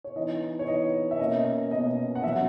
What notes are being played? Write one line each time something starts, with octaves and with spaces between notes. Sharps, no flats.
C#5
E3 B3 D#4 D#5
C#5
E3 B3 D#4 D#5
E5
B2 A#3 C#4 D#5
D#5
B2 A#3 C#4 D#5
F#5
B2 F#3 C#4 E5